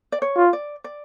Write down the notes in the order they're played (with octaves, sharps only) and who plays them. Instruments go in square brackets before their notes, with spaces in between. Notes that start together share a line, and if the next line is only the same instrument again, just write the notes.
[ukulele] D5
C#5
[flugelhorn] F4
[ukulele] D5
D5